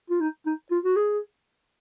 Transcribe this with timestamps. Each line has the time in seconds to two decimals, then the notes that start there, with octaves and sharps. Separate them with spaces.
0.10 F4
0.21 D#4
0.46 D#4
0.71 F4
0.84 F#4
0.96 G#4